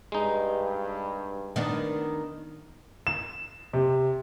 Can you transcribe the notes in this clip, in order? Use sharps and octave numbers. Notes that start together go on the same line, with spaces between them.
G2 G#3 D#4
D#3 B3 D4
E7
C3